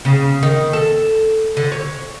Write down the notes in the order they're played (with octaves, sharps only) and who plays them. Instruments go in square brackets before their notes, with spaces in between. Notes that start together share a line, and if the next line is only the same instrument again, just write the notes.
[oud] C#3
D#3
A4
D3
C#5